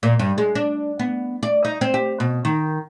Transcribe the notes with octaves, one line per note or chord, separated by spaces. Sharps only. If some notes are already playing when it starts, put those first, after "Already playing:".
A#2
G2
G#3
D4
B3
D5
D#4
C4
G4
B2
D#3